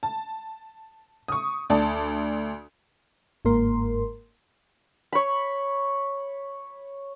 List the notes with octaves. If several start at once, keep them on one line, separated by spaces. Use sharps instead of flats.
A5
C#6 D#6
D2 D5 A5
G1 G#2 A#3 A#4 C6
C#5 B5